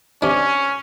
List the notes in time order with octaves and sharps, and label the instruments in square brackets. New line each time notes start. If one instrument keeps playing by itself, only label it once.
[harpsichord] C3 D4 [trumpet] C#4